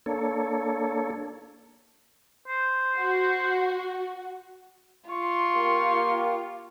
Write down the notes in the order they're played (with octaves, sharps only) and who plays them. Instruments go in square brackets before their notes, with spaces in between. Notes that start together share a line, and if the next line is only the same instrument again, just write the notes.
[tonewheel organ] A#3 D4 A4 C#5
[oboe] C5
[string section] F#4
[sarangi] F4 [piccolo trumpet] C6 [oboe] C#6
[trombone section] A#3 G4